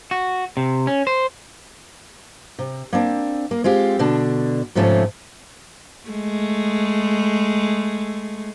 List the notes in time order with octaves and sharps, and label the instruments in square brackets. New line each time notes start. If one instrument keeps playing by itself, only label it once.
[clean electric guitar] F#4
C3
C#4
C5
[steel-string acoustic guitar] C3
A#3 C4 D4
A#3
G#3 C4 F4 G4
B2 D3 D4
G#2 C3 F3 A3 C#4 F4
[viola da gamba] G#3 A3